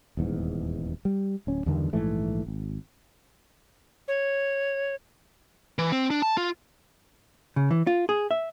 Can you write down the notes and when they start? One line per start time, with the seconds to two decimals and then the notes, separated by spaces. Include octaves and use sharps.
0.17 D#1 E2 G#2
1.05 G3
1.47 D1 C#4
1.66 E2 G2 D3 D#3
1.93 A#1 G#2 E3 A3
2.47 G#1
4.08 C#5
5.78 E3
5.92 C4
6.10 D4
6.22 A5
6.37 F4
7.56 C#3
7.71 E3
7.87 F4
8.09 G#4
8.31 E5